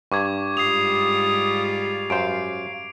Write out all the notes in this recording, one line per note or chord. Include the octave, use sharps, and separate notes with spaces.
G2 C#6 D6 G#6
G#2 G3 F4 D#6 C7 F7
F#2 C5 F5 D7